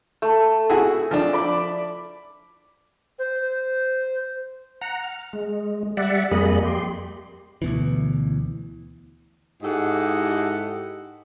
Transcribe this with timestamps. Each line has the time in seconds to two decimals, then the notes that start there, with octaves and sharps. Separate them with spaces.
0.22 A3
0.70 E4 F#4 G#4
1.11 F3 D4
1.33 D5 B5 D6
3.19 C5
4.81 F#5 A#5
5.03 F6
5.33 G#3
5.97 G3 D5 E5 F#5
6.31 F2 G3 A#3 G#4 D#5 B5
6.63 G4 C6
7.62 D2 B2 E3
9.63 G#2 E4 G4 A4 D#5 F#5